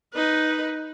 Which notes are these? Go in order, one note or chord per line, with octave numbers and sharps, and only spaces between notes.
D#4 B4